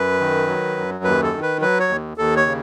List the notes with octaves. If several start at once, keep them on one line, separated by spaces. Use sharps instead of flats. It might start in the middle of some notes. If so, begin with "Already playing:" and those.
Already playing: F#2 B4
D#3
F#3
F#2
D#2 B4
A4
D#3
B4
F#3 B4
C#5
D#2
D#2 A4
C#5
C#3